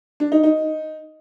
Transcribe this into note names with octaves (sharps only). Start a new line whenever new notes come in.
D4
D#4
D#4